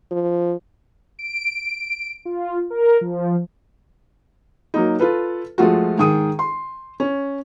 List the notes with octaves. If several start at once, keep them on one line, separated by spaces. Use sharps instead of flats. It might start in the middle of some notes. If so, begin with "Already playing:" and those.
F3
D7
F4
A#4
F3
F#3 A#3 D#4
F4 A4 B4
F3 G#3 A3 F4 F#4
G#2 D#3 G#4 D#6 D#7
C6
C#4